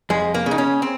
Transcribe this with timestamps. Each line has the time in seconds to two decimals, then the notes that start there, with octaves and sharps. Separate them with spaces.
0.10 F2 G#3
0.34 A#3
0.46 C#3
0.51 D#4
0.58 C#4
0.82 C4